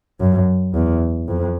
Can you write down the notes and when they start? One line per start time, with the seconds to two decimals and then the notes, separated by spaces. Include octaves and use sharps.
0.20 F#2
0.74 E2
1.28 F2